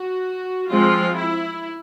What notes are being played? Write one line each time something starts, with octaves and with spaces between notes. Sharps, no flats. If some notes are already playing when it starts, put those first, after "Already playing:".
Already playing: F#4
F3 G#3 C4 F4
E4